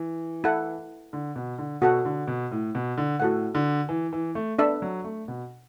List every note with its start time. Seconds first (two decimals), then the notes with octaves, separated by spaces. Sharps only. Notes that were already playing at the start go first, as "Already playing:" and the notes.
Already playing: E3
0.44 E4 A4 F#5
1.13 D3
1.36 B2
1.58 D3
1.81 B2 F#4 A4 F#5
2.05 D3
2.27 B2
2.51 A2
2.75 B2
2.97 D3
3.20 A2 F#4 A4 F#5
3.55 D3
3.89 E3
4.13 E3
4.35 A3
4.58 B3 D4 A4 E5
4.82 F#3
5.04 A3
5.28 B2